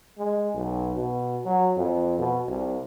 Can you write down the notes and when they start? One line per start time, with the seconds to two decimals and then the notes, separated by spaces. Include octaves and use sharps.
0.18 G#3
0.55 B1
0.96 B2
1.45 F#3
1.77 F2
2.19 B2
2.48 C2